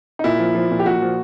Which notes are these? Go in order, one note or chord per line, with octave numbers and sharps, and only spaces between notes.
D#4
A#2 E4
F3
F3
A#2
G4
A#2 F#4
F3